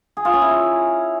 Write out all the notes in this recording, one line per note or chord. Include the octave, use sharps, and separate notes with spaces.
G#4
F4
C#4
E4